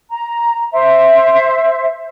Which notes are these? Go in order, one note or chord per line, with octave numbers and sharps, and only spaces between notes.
A#5
C5 E5